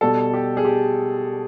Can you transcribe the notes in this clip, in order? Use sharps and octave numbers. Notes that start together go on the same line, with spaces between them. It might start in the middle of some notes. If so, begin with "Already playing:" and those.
B2 G3 A4
G4
G#4
G4